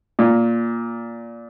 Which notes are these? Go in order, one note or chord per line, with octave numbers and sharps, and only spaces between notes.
A#2